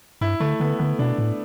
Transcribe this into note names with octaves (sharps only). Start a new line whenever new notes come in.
G2 E4
D3 A3
D3 B3
D3 B3
B2 D4
A2